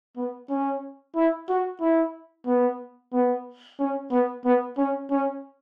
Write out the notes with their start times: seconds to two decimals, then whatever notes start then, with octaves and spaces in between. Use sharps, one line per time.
0.17 B3
0.50 C#4
1.15 E4
1.49 F#4
1.81 E4
2.46 B3
3.13 B3
3.79 C#4
4.11 B3
4.45 B3
4.77 C#4
5.11 C#4